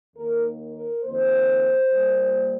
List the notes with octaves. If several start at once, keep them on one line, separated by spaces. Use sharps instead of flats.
D#2 D#3 A#3 A#4
A#4
F2 D#3 A#3 C5
A#2 G3 A#3